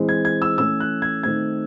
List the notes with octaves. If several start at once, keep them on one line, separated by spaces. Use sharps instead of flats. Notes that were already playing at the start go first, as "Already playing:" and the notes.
Already playing: E3 G#3 C4
G#6
G#6
E6
E3 A3 C#4 E6
F#6
G#6
D#3 A3 C4 G#6